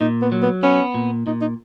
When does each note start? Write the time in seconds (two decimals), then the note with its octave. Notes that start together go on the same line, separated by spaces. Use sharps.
0.01 A#2 D#4
0.22 B3
0.32 F#3
0.42 B3
0.63 B3 C#4
0.94 A#2
1.27 A#2 D#4
1.41 D#4